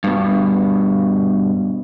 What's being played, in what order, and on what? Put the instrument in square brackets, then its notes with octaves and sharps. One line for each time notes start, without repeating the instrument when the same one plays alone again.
[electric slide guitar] G2 B2